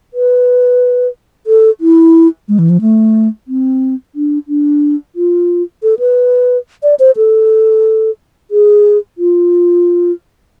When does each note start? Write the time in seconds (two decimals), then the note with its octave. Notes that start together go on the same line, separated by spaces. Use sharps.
0.14 B4
1.47 A4
1.81 E4
2.48 G#3
2.59 E3
2.70 F3
2.81 A3
3.48 C4
4.15 D4
4.48 D4
5.16 F4
5.83 A4
5.99 B4
6.83 D5
6.99 C5
7.17 A4
8.51 G#4
9.18 F4